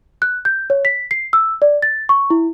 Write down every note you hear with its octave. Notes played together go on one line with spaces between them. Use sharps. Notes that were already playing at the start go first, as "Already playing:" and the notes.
F#6
G6
C#5
B6
C7
E6
D5
A6
C#6
E4